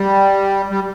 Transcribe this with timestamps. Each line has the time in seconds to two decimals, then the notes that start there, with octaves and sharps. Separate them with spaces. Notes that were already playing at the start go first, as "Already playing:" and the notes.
Already playing: G3
0.71 G3